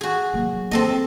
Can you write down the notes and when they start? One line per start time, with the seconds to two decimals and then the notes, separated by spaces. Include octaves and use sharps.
0.01 F#4 G#4
0.34 F#3 A#3
0.71 A#3 C4 A4 D#5